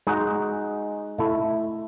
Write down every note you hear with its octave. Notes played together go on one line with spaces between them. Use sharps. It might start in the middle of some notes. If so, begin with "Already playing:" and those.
G#3 D#4 F#4
A3 E4 A4